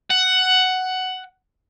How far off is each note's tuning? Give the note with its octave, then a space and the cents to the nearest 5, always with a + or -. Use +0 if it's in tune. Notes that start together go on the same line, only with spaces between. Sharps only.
F#5 +10